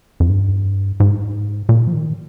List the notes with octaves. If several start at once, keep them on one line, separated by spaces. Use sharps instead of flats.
F2
G2
G#2
A#2
F3
D#3